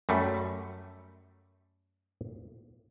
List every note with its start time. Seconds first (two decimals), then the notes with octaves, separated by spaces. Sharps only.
0.09 F#2 G3 A3